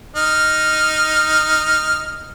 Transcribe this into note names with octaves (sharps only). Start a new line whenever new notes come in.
D#4 F6